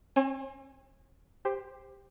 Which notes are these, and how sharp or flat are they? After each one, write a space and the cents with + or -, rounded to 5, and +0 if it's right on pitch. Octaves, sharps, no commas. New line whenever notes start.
C4 +40 C#5 -25 G#5 +0
G4 +15 C5 +0